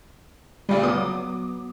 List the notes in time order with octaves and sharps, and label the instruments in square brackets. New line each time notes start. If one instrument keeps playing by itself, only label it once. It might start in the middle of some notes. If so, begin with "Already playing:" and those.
[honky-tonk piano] D2 A#2 C#3 [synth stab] G3
[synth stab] F#3 B3 [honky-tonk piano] D6 D#6